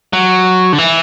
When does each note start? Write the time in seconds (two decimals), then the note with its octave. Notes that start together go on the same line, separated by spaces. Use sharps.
0.13 F#3
0.73 D3
0.78 E3